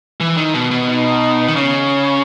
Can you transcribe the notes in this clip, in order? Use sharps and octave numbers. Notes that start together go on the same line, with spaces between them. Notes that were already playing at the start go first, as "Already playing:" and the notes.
E3
D#3
B2
B2
D#4
D#3
C#3 C#4